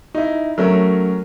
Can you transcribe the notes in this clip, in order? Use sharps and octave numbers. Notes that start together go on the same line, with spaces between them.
D#4 E4
F#3 A3 C#4 A#4